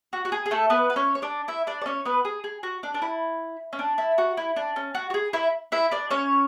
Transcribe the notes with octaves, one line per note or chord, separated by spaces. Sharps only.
F#4
F#4
G#4
G#4
A3 A4
B3 B4
B4
C#4 C#5
C#5
D4 D5
E4 E5
D4 D5
D5
C#4 C#5
B3 B4
G#4
G#4
F#4
D4
D4
E4
C#4
D4
E4
F#4
E4
D4
C#4
F#4
F#4
G#4
E4 E5
E4 E5
D4 D5
C#4 C#5